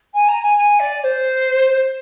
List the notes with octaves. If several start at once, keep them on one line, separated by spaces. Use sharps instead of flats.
G#5
A#5
G#5
G#5
D5
D5
C5